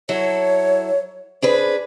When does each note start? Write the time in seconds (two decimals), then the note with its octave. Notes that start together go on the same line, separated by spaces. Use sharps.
0.09 F#3 E4 A4 C#5
1.42 D4 G#4 B4 C5